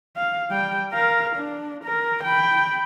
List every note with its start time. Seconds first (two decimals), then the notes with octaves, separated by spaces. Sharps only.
0.16 F5
0.50 G3 G5
0.93 A#4 F5
1.36 D4
1.85 A#4
2.24 G5 B5